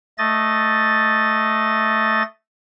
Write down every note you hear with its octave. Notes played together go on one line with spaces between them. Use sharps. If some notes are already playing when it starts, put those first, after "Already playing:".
A3 D#5 A6